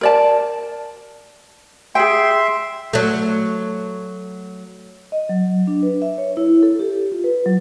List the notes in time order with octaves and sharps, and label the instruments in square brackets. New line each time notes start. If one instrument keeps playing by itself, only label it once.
[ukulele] A#4 D5 A5
[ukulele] G#4 G5 [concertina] E5 C6
[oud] F#3 A3
[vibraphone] D#5
F#3
D4
B4
E5
C#5
E4
A4
G4
F4
B4
F#3